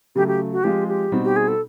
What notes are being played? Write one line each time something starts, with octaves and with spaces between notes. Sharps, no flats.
C#3 F#3 A3 G4
G4
F#4
F3 G#3 C4 F4 G4
G4
B2 G3 C4 D#4 F#4
G4
G#4
A4